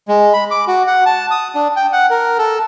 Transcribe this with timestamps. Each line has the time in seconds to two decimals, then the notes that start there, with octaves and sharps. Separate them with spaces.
0.08 G#3
0.33 B5
0.51 D6
0.67 F#4
0.87 F#5
1.06 A5
1.31 D#6
1.55 D4
1.76 G5
1.93 F#5
2.10 A#4
2.38 A4